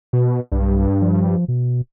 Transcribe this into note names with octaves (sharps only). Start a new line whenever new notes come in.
B2
B1 G2
F3
B2